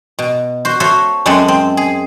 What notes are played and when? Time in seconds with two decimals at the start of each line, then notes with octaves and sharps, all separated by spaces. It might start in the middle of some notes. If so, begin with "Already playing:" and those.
0.19 B2
0.65 F#4 C5
0.80 F#4 A4 C5 C#5 E5
1.26 F#2 G#3 C4 A4 E5 F#5
1.48 C4
1.77 G#4